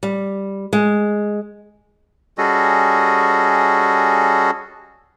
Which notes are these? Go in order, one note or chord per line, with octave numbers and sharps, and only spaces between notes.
G3
G#3
G3 C#4 F#4 G#4 A4 D#5